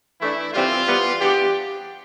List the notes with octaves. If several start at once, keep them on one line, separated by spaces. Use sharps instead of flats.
E3 A3 D4 E4
C3 E3 G3 C4 F4
E3 G3 B3
E3 B3 D4 G4